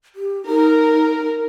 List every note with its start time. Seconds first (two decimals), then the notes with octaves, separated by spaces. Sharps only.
0.15 G4
0.47 D#4 A#4